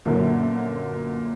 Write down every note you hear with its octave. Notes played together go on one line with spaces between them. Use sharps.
G1 F#2 A#2 D3 F#3 A#3